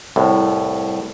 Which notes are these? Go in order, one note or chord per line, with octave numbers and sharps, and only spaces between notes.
C2 A2